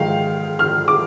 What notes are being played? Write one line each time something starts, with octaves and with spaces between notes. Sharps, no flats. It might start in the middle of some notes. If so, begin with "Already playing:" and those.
Already playing: G#2 D#3 G#3 F5 G5
F6
D6